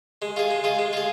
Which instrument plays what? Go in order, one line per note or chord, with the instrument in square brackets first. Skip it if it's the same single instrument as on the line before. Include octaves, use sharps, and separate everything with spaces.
[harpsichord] G#3
F4 G#4
G#3
F4 G#4
G#3
F4 G#4